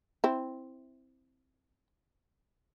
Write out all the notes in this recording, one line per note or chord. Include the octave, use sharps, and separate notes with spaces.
C4 E4